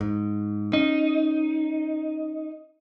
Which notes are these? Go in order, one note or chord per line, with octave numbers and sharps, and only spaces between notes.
G#2
C#4 D#4